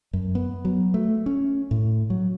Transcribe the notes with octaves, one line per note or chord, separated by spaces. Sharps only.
F#2
B3
F#3
A3
C#4
A2
F#3